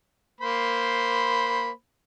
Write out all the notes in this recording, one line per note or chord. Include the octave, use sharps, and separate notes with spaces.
A#3 C5 B5